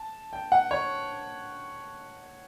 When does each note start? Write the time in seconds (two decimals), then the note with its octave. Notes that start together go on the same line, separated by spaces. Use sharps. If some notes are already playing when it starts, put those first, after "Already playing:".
Already playing: A5
0.33 G5
0.52 F#5
0.71 C#5